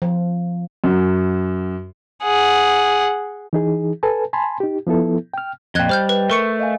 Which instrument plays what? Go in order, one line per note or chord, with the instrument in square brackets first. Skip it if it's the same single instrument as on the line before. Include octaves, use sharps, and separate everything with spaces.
[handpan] F3
[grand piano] F#2
[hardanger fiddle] G#4 F#5
[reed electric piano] E3 D#4 G#4
A4 B4 G#5 A5
G#5 A5 B5 C6
D#4 G4
F3 B3 E4 A4
G5 F6
[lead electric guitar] F2 A#2 [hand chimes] D#5 G5 [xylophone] F#6 G#6 G7
[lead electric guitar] G3 [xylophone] C5 F6 G6
[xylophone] B4
[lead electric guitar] A3 [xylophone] A#4 C#6 C#7
[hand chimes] D#5 F5 G#5